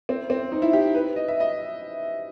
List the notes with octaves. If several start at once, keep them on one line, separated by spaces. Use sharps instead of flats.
C4
C4
D#4
E4
G4
B4
D#5
E5
D#5